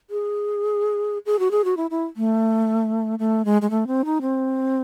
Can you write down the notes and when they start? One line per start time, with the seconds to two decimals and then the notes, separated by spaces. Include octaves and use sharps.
0.10 G#4
1.26 G#4
1.39 F#4
1.51 G#4
1.65 F#4
1.77 E4
1.91 E4
2.17 A3
3.19 A3
3.45 G#3
3.62 G#3
3.70 A3
3.87 C4
4.05 D#4
4.21 C4